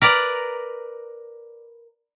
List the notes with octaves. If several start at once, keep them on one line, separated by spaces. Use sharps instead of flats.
A#4 B4 D5 A#5